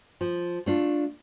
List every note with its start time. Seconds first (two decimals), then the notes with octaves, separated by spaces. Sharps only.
0.21 F3
0.66 A3 D4 F4